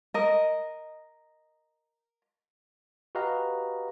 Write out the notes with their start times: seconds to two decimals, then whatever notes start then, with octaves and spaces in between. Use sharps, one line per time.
0.14 A#4 D#5
3.15 F#4 G4 B4 D#5 F5 A#5